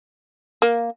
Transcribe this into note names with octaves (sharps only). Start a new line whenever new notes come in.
A#3